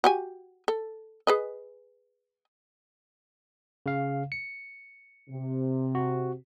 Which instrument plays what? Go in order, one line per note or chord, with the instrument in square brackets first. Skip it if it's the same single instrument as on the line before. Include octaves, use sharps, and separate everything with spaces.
[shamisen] F#4 G4 G#5
A4
G#4 B4 D#5
[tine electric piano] C#3 F5
C#7
[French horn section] C3
[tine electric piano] F#4